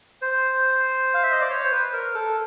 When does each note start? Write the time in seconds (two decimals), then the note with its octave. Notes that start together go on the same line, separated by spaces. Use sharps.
0.22 C5
1.14 F5
1.23 E5
1.32 D#5
1.41 D5
1.50 C#5
1.64 C5
1.71 B4
1.93 A#4
2.14 A4